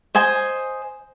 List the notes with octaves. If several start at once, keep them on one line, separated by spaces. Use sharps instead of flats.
C5 D#5 G#5